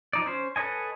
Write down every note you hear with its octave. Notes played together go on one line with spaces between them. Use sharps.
F3 D#4 D5
C#4 C5
A4 B4 C#5 D#5 G#5